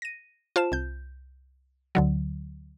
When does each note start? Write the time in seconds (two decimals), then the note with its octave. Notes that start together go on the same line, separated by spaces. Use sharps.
0.02 A#6 D#7
0.56 F4 C5 A5 E7
0.72 C2 G6
1.95 D2 D3 F#3